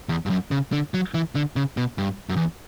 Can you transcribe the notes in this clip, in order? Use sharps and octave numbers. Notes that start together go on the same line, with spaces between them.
E2
G2
F#2
C#3
D3
F#3
E3
D3
C#3
B2
G2
F#2
E2